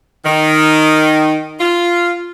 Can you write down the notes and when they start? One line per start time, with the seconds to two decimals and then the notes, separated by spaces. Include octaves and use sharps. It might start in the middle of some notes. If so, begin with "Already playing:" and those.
0.25 D#3
1.60 F4